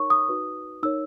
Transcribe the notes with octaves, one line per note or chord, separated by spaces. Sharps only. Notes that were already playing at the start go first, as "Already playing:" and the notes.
Already playing: D#4 A#4 C#5 C#6
D#6
D#4 F#4 B4
D#4 A#4 C#5 E6